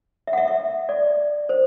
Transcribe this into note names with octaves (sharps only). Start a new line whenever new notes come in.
E5
F#5
E5
E5
D5
C5